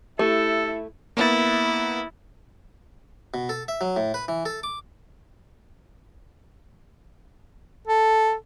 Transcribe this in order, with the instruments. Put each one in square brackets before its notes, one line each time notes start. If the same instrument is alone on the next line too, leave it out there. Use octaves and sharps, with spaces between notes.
[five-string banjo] A3 [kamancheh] E4 [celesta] G4 [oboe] A4
[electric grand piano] A#3 B3 A6 [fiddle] E4
[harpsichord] B2
A4
E5
F#3
A2
B4
E3
A4
D6
[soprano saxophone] A4